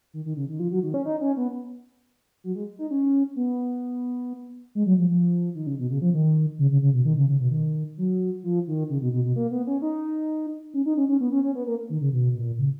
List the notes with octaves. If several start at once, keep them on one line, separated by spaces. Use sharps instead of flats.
D#3
D#3
C#3
D#3
F3
F#3
D#3
C#4
D#4
C#4
B3
F#3
G#3
D#4
C#4
B3
G#3
F#3
F3
F3
D#3
C#3
B2
C#3
F3
D#3
C#3
C#3
C#3
B2
D#3
C#3
C#3
B2
D#3
F#3
F3
D#3
C#3
B2
B2
B2
A#3
B3
C#4
D#4
C#4
D#4
C#4
C#4
B3
C#4
C#4
B3
A#3
D#3
C#3
B2
A#2
C#3